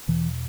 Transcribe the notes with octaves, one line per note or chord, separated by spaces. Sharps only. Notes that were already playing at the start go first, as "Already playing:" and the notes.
E2 B2 E3